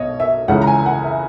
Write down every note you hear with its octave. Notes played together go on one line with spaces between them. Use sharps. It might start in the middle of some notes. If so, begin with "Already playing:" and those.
Already playing: B1 B2 C#5 D#5
E5
C#2 C#3 E3 F#5
A#5
G#5
F#5
E5